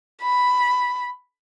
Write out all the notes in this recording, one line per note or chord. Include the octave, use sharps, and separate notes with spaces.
B5